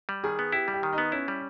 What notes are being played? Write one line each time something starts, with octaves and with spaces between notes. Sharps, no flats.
G3
D#3 G#4
B3
E4 G4
G3
G4
D#3
D#4
B3
C#4 E4
G3